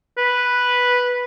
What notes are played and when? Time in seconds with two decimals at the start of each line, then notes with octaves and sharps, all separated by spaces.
0.18 B4